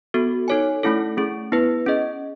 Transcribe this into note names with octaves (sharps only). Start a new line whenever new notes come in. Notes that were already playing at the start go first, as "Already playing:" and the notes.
B3 F#4 A4
D#4 A4 C#5 G#5
A3 C#4 E4 A4
A3 C#4 G#4
B3 E4 B4
C#4 G#4 D#5